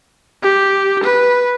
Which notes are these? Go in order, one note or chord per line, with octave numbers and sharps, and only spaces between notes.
G4
B4